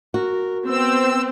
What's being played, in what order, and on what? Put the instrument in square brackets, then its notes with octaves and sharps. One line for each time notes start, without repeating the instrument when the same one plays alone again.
[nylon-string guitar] F#4 [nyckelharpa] A#4
[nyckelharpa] B3 [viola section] C4 [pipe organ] E6